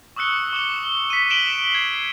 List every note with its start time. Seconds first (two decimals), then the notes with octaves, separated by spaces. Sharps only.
0.16 C#6 D#6 E6 F#6 C#7 G7
0.53 C#6 D6 E7 G7
1.10 B6 C#7 D#7
1.30 B6 D7 E7 F#7 G7
1.71 G#6 C7